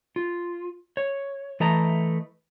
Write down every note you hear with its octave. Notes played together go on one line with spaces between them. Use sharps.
F4
C#5
E3 A3 B4 D#5 A5 A#5